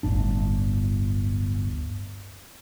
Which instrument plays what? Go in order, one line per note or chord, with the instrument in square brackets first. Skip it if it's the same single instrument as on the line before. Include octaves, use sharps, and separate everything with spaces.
[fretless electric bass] D1 G1 D4